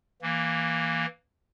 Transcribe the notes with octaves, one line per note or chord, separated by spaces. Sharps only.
E3 A#3